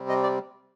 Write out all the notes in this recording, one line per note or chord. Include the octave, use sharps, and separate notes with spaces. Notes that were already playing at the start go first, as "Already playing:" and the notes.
Already playing: C3 G3 C4
D#5
D5